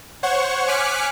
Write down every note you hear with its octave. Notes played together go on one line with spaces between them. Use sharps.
C5 C#5 F#5 C#6
G#5 D6 F6 F#6 B6 C#7